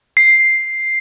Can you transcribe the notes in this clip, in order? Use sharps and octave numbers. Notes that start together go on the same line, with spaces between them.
C7